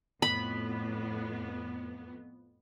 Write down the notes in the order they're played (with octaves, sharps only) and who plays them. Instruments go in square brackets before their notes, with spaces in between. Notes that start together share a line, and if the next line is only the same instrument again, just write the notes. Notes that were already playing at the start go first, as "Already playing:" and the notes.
[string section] F2 B3 [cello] A2 [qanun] B5